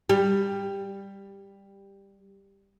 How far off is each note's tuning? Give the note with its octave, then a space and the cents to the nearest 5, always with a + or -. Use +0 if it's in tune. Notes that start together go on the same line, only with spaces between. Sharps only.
G3 +10